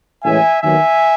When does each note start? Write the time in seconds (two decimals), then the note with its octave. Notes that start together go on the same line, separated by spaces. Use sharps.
0.23 A1 A2 E3 G#3 C#4 E5 G#5
0.63 D#2 D#3 F#3 B3 E5 G#5